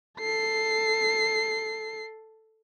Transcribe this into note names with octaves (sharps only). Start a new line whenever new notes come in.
A4 C7